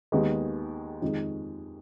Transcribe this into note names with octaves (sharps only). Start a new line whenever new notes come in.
D#2 D#3 G#3 B3
F2 D#3 G#3